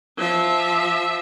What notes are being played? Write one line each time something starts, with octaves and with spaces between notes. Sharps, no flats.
F3 E5